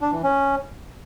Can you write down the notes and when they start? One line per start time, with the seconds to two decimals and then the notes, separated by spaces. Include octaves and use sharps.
0.01 D4
0.12 E3
0.23 C#4